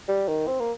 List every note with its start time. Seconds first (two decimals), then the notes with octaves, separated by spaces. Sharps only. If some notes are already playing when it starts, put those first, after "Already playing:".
0.08 G3
0.28 D#3
0.47 C4
0.60 A#3